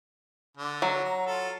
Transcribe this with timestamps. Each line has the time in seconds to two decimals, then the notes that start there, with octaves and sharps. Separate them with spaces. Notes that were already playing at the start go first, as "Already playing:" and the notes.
0.57 D3
0.82 F#3
1.04 A#5
1.26 F4 A4